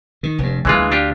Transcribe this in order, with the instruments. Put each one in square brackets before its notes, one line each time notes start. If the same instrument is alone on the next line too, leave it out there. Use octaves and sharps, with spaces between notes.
[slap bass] D#3
F1 G2
[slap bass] F#1 G#2 D3 [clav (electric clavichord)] E3 G#3 F4
[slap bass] D2
[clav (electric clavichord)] D4 F4 G4